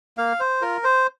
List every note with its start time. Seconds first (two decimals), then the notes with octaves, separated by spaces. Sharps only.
0.17 A#3 F5
0.40 C5
0.62 F4 A#4
0.84 C5